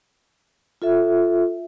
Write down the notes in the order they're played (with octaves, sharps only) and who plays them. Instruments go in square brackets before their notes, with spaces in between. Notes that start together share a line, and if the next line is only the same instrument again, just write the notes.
[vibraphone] F4 A4 E5